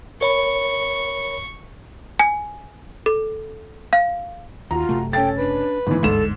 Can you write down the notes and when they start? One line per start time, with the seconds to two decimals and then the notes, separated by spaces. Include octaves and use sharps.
0.21 A#4 C#5 B5 C#6
2.19 G#5
3.06 A4
3.93 F5
4.71 D#2 F4 F#4 A#5
4.89 F#1 C3 A3
5.13 C#4 A4 G5 A6
5.38 D4 B4
5.87 G1 G#2 E3 D#4
6.03 G1 D2 G#2 A4 E7